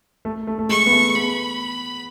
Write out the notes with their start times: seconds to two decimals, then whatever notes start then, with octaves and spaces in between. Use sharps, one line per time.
0.25 A3
0.47 A3
0.59 A3
0.69 G#3 C#6
0.86 B3
0.92 A3
1.15 B3 B5